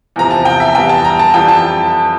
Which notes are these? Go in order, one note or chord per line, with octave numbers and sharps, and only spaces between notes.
E2 C3 F3 A#5
A5
G5
E5
E2 E3 G3 G5
A5
A#5
A5
F2 E3 G3 G5
A5